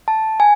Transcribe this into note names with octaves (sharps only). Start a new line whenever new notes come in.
A5
G#5